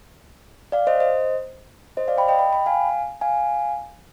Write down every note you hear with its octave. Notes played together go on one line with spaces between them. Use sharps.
D5 F5
C5 D#5
C5 D#5
C5 D#5
D5 F5
G5 B5
D#5 G5
G5 B5
G5 B5
F5 G#5
F5 G#5